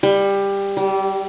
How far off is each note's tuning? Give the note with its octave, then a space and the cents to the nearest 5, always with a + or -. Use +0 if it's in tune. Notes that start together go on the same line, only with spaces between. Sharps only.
G3 +15
G3 -25